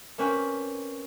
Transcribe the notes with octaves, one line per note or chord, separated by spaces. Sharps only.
A#3 C4 C#4 F#4 B4